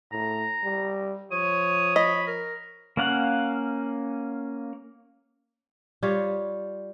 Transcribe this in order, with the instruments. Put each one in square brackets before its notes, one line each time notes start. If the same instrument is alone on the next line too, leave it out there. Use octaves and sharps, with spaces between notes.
[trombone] A2 [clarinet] A#5
[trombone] G3
[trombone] F3 [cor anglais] C#5 [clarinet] D#6
[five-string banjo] D#5 [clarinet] B5
[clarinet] A#4
[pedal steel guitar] A#3 C#4 F5 F#5
[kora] G3 F4 C#5